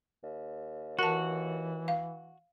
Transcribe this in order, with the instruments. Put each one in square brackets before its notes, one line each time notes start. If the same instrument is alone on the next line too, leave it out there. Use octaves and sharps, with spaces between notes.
[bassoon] D#2
[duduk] E3 [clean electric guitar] F#4 [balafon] A#4 A5
[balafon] F5